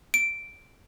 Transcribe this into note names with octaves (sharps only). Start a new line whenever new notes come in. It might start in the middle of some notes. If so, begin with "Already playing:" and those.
D7